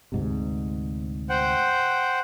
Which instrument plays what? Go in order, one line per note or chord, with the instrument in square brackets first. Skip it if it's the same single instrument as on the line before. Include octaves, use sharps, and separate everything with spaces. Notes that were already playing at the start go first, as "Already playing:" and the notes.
[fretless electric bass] D2 G#2 C3
[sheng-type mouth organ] C5 F#5 G5